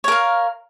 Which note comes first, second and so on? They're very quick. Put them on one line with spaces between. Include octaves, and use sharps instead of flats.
C#5 A#4 F5